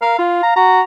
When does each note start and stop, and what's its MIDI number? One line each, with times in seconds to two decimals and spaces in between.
0.02 0.15 70
0.02 0.17 77
0.19 0.40 65
0.19 0.52 77
0.43 0.54 82
0.56 0.82 66
0.56 0.81 82